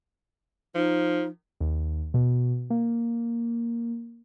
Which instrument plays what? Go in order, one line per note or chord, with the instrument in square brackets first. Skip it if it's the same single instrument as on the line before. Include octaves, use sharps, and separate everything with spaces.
[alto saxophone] F3 [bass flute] D#4
[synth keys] D#2
B2
A#3